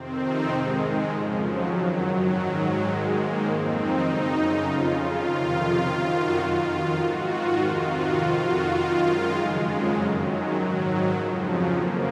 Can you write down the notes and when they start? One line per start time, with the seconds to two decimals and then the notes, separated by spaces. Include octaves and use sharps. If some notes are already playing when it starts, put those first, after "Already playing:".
Already playing: F2 C3 D#3 C4
0.20 D#4
0.49 G#2 D#3 G#3
1.08 F2 C#3 F3
1.38 F#3
1.67 F#2 D#3
2.26 G#2 D#3 F#3
2.56 G#3
2.86 G#2 D#3
3.15 A#3
3.44 F2 D#3 C4
3.73 D#4
4.03 F#2 C#3
4.62 F2 C#3 F4
4.93 F4
5.21 F2 C3 D#3 F4
5.81 F#2 D#3
6.10 F#4
6.40 F2 D#3 F4
6.98 G#2 D#3 F#4
7.28 F4
7.57 F2 C3 D#3 F4
7.88 F#4
8.16 F2 D#3 F4
8.46 F#4
8.75 F#2 D#3 F4
9.05 G#3
9.34 F2 C#3 G#3
9.64 F#3
9.93 F#2 D#3
10.23 F#3
10.53 G#2 D#3 F#3
11.12 F2 C#3 F3
11.42 F#3
11.71 F2 C#3 A#3